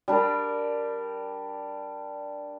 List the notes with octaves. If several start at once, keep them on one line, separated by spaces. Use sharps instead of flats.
G3 D4 A#4